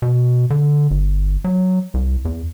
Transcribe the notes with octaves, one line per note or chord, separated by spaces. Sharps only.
B2
D3
G1
F#3
C2
E2